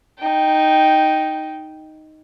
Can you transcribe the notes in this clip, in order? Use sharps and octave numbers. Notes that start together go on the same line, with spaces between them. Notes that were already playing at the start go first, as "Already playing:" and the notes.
D#4 G5